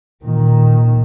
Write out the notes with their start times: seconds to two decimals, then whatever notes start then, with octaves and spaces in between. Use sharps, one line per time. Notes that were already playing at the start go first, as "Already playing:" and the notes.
0.23 A#2 D#3